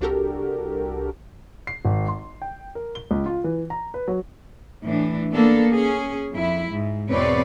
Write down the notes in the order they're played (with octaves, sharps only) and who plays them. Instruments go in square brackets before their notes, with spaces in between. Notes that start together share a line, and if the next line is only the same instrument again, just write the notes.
[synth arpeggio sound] C2 D4 F#4 G4 A4 A#4
[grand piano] C7
G#1
C6
G5
A#4
G7
C#2
F4
E3
A#5
B4
F#3
[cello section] A2 E3 D4
A#3 B3 D4 A4
C#4 G#4
F2 E4
G#2
E2 B2 C4 B4 C#5 D5